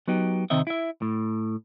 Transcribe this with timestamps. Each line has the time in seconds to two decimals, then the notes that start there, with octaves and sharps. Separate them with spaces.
0.08 F#3 B3 D#4 G4
0.50 C3 D#3 C4 D#5 E5
0.67 E4 E5
1.02 A2